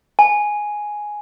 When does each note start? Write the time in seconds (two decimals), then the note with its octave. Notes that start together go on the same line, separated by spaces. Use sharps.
0.19 G#5